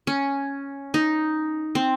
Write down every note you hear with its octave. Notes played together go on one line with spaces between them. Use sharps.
C#4
D#4
C4